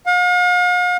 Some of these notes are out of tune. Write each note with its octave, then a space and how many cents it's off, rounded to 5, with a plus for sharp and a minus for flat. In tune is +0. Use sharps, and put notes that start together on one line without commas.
F5 +45